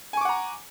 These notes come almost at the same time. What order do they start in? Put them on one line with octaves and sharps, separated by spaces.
G#5 C#6 D6 F#5 A#5